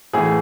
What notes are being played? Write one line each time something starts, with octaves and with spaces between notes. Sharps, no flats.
A1 A2 E3 A3 G#4